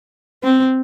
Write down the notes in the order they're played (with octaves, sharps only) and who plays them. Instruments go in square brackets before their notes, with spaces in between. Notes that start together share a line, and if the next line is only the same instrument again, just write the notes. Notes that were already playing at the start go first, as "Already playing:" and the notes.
[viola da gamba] C4